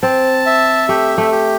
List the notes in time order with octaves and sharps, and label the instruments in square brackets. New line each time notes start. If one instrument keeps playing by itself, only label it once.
[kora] C4 [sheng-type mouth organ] A5
[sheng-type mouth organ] E5
[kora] A3 [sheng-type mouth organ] G4
[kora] A3
[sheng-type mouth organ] G4